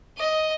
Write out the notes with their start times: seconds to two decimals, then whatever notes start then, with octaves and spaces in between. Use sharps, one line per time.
0.18 D#5